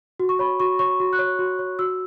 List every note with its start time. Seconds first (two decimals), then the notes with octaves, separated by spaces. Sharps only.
0.20 F#4
0.29 C#6
0.39 C#5 B5
0.60 F#4 C#6
0.79 C#5 C#6
1.00 F#4
1.13 F#6
1.19 C#5
1.39 F#4
1.59 C#5
1.79 F#4 E6